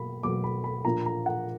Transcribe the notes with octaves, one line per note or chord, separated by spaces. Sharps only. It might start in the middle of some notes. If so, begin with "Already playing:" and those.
Already playing: B2 F#3 A#3 B5
B2 F#3 A#3 D6
B5
B5
A#2 F3 A#3 D4 A#5
A#5
F#5